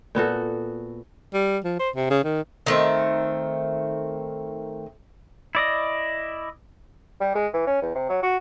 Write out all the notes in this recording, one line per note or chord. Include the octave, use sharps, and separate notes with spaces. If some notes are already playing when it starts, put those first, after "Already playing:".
A#2 B3 F#4 A4
G3
F3
C5
C3
C#3
D#3
D#3 A3 C4
E4 D5 D#5
G3
G#3
E3
C#4
E2
C3
F#3
F#4